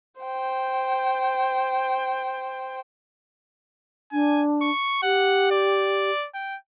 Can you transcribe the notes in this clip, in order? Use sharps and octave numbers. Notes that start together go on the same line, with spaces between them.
C5 G5
D4 G#5
C#6
G4 F#5
D5
G5